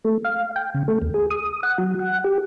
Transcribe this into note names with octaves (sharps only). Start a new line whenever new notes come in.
A3
F5
G5
C#3
A3
D#2
G#4
D#6
F#5
F#3
F#5
G4